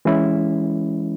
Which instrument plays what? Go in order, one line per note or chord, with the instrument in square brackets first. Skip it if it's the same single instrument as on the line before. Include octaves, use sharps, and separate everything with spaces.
[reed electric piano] E3 G#3 C#4 E4